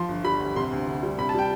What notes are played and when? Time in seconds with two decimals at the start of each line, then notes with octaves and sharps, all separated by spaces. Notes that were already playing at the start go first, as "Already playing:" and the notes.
Already playing: F3 C6
0.08 G1
0.24 G3 B5
0.40 D2
0.56 C3 C6
0.72 D2
0.87 D3
1.03 G3
1.18 C3 B5
1.29 A5
1.34 G3 G5